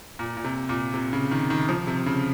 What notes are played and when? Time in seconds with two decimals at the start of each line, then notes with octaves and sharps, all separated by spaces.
0.19 A#2
0.37 A#2
0.44 C3
0.69 A#2
0.94 C3
1.13 C#3
1.31 D#3
1.50 D#3
1.69 F3
1.87 C3
2.06 C#3